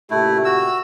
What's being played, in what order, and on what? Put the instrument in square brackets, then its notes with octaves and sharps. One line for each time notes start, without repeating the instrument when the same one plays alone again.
[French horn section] A#2 C#3 G4 [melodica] A3 E4
[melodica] F#4 E6